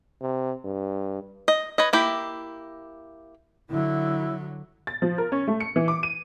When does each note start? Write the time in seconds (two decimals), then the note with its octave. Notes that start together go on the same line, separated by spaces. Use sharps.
0.21 C3
0.64 G2
1.48 D#5
1.78 B4 C#5 D#5
1.93 A#3 E4 G4
3.70 D3 F#3 E4
4.87 A6
5.02 F3
5.18 A#4
5.32 C#4
5.48 A3
5.60 C#7
5.76 E3
5.88 D6
6.03 D#7